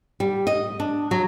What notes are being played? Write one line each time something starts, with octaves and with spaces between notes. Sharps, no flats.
G3
D#5
D4
F#3